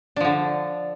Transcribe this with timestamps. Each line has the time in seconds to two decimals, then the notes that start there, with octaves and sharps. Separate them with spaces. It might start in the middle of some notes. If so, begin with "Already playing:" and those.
0.16 D4
0.21 F3
0.25 D3